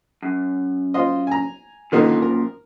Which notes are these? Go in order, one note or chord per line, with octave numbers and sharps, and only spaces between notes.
F#2
F4 C5 D#5
G#5 A#5
F#2 A#2 D3 D#3 F3 D#4
A#4